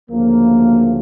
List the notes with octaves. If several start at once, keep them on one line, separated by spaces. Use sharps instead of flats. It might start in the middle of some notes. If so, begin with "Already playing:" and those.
D2 C#3 F3 A#3